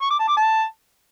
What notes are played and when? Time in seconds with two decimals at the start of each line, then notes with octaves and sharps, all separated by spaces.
0.02 C#6
0.10 D6
0.19 A5
0.28 D6
0.37 A5